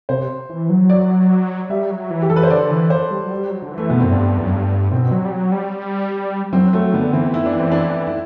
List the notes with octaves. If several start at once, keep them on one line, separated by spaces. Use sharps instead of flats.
C3 C5
E3
F#3
D5
G3 E5
F#3
E3
G4
E3 A4
B4
C5
D3 D5
E3
C5
G3
F#3
G3
F#3
D3
E3
A3
B2 B3
F#2 C4
G2 D4
E2
F#2
G2
B2 C4
F#3
G3
F#3
G3
F#3 C4
F#3 A3
D3 B3
E3 C4
E4
D4
C4
D4
E4